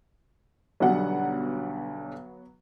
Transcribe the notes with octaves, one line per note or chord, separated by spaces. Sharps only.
B1 D3 F#3 G3 B3 F#5